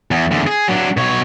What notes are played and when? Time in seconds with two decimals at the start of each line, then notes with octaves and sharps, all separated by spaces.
0.11 E2
0.31 E2 D3
0.47 G#4
0.68 F#3 D4
0.97 B2 C#5